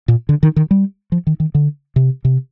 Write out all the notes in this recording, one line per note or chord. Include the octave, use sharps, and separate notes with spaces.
A#2
D3
D#3
D#3
G3
F3
D#3
D#3
D3
C3
C3